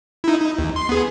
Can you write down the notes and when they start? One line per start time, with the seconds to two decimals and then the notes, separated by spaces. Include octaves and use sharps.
0.24 D#4 E4
0.40 D#4
0.58 D#2
0.76 C6
0.89 B3 G#4